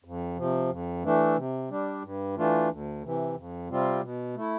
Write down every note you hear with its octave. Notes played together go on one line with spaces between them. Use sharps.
F2
C3 F3
F2
E3 A3 D4
C3
G3 D4
G2
E3 A3 D4 F4
D2
C3 E3
F2
C3 G3 C4 F4
B2
A3 E4